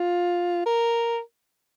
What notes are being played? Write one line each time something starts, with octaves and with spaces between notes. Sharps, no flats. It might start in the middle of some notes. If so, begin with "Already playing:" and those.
Already playing: F4
A#4